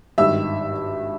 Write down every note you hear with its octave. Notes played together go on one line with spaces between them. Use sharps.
G#1 G2 D#3 E5 E6